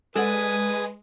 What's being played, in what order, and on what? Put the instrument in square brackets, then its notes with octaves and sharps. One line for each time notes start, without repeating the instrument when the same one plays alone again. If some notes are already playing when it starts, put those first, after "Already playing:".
[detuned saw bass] G#3 [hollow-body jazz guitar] A4 D5 F#5 [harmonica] B4 [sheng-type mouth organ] G#5 D#6